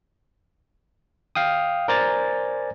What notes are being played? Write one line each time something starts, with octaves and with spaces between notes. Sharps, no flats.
F5 G5 D#6
A#4 C5 D5 G#5 A#5 A6